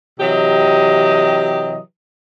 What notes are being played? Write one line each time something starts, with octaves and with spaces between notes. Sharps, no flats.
C3 E3 F#3 G4 D#5